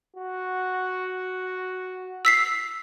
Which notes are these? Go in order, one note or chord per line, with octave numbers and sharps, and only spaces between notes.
F#4
E6 B6 C7